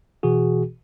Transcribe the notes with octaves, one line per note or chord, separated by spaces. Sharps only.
B2 E3 F#4 G#4